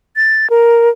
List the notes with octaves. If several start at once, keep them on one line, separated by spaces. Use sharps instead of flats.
A6
A#4